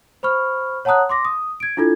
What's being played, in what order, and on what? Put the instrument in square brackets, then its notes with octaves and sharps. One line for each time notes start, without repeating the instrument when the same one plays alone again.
[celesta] C5 B5 C#6 F6
C#5 F#5 A5 A#5 D#6 F#6
C6 D6 A#6
D#6
G#6 D7
D4 E4 F4 A4 G#6